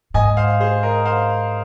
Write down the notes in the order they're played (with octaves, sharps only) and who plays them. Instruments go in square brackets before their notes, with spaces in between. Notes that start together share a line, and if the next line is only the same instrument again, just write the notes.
[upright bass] G#2 [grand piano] D#5 G#5
[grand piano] C5 F5
G#4 C5
A#4 D#5
C5 F5